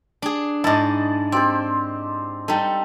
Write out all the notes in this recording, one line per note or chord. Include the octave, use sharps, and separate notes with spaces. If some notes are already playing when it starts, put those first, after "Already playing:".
D4 G#4
G#2 E4 D5 D#5 A5
C4 G4 C5 D5
G3 D#4 A4